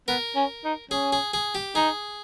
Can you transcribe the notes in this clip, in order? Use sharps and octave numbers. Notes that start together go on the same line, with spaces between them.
B3 A#4
C#4
D#4
C#4 G#4
G#4
G#4
G4
D#4 G#4